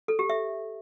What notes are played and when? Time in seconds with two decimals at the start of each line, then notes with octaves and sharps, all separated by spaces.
0.08 A4
0.19 G4
0.30 E5